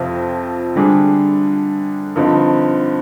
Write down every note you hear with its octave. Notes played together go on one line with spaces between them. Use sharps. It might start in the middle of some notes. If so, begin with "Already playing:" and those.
Already playing: F2 C3 F3 C4 F4
D3 G3 D4 G#4
G2 D3 F3 C4 D#4